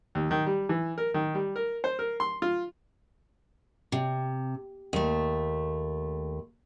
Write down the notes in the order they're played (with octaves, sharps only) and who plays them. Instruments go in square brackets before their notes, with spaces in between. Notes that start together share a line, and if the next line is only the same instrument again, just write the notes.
[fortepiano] D#2
D#3
G3
E3
A#4
D#3
G3
A#4
C5
A#4
C6
F4
[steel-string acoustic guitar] C3
D#2 A3